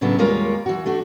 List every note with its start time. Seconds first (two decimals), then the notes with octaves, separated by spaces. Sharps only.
0.01 A2 C#3 F#3 B3 D4 E4
0.18 D#2 G3 G#3 F4 A#4 C#5
0.66 E3 F#4
0.86 A3 D4 F#4